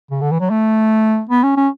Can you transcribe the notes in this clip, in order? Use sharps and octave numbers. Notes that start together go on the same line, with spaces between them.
C#3
D3
E3
F#3
A3
B3
C#4
C#4